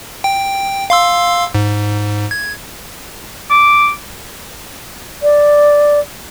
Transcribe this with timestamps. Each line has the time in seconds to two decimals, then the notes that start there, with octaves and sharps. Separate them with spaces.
0.24 G5
0.90 F5 C6 E6
1.55 G#2
2.31 G#6
3.50 D6
5.23 D5